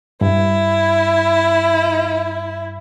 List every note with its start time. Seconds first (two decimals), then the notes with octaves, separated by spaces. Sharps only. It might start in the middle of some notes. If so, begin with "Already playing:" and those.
0.21 G2 E4